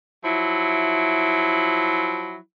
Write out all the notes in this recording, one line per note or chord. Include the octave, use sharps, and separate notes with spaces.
F3 F#3 E4